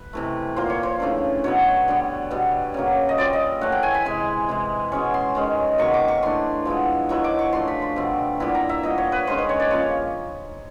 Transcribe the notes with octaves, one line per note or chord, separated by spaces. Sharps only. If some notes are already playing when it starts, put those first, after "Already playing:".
Already playing: B4
C3 E3 A3
A#2 F3 A#3 C5
C#5
C5
C#3 E3 A3 D4
B2 F#3 B3 C#5
D3 G3 B3
B2 G3 B3
C#3 F#3 A#3
D#5
A#2 G3 C4 D5
D#5
A2 E3 A3 F#5
G5
G#5
B5
C3 E3 G#3 C6
C3 E3 G#3
B2 G#3 C#4 C#6
C6
D#3 G#3 C#4
C3 D#3 F#3 A#3 C#6
D6
C#6
E3 A3 D4 C6
F3 G#3 B3 E4
D#3 F#3 B3 E4 C#6
D6
C#6
F3 A3 D4 C6
B5
C6
B2 G3 C4
A#2 G3 B3 E4 B5
A#5
E5
A#2 G3 B3 D#5
C#5
B4
D#3 G#3 C#4 C5
B4
C#5
D5
C#3 F3 A#3 C#5